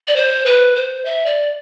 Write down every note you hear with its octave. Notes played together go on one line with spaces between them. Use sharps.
D5
C5
B4
C5
E5
D5